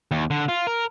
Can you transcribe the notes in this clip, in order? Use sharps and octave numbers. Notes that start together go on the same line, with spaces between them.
D#2
D3
F4
A#4